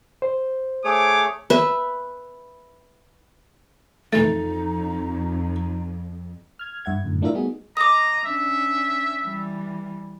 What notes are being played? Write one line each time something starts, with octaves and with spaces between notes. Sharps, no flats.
C5
A3 G#4 C#5 D6
B4 E5
F2 E3 A3 D#4 A4
F6 G#6
G2 E5 F#5 G#6
F#2 A2 D3
A3 D4 E4 F4 A#4 E5
G3 A3 B3 D#4 F#4 G#4
D#5 A#5 D6 D#6
C#4 D4 E5
E3 G3